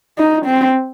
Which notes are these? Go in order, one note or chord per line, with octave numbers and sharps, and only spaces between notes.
D#4
C4